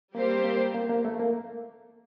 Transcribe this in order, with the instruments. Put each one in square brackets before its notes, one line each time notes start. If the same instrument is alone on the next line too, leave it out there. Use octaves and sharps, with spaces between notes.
[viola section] G3 C4 G4 C5 [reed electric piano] A#3
[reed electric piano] A#3
A#3
A#3
A3
A#3